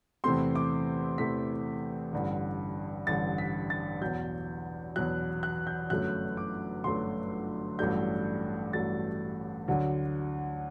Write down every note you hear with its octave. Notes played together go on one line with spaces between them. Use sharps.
E2 C3 E3 A3 C4 C6
D6
E2 C3 E3 A3 C4 B6
A1 G2 D3
A1 G2 D3 A6
B6
A6
E2 B2 F#3 G6
E2 B2 F#3 F#6
F#6
G6
G1 F#2 F#3 A3 F#6
D6
G1 F#2 F#3 A3 C6
A1 G2 F#3 A3 D4 G6
A1 G2 F#3 A3 D4 A6
D2 D3 F#3